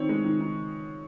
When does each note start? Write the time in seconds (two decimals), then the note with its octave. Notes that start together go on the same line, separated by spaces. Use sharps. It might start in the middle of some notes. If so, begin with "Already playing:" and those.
Already playing: D#3 C4 C#5
0.09 G#3
0.24 D#3
0.40 D#3